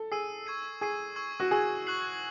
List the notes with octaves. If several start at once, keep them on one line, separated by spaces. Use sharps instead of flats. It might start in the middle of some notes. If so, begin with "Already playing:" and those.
Already playing: A4
G#4 E6 C7 D#7
C#6 G#6 C7 D#7
G#4 C#6 G#6 C7 D#7
C#6 E6 G#6
F#4
G#4 C#6 E6 G#6
C#6 F#6 C7 F#7